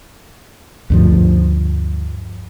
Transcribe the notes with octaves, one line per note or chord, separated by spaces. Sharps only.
D2 G2 F3